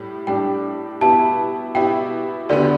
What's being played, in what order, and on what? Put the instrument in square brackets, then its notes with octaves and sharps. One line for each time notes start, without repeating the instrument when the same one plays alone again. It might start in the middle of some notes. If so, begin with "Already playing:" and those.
Already playing: [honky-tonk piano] A2 G3
[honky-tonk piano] A2 G3 D4 G4 [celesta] G5
[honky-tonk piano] B2 B3 E4 G4 [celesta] A5
[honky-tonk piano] B2 B3 E4 G4 [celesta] G5
[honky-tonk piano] D2 D3 B3 G4 [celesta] D5